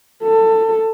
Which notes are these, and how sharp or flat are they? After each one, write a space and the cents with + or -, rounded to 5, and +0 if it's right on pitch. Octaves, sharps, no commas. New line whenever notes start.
A4 +20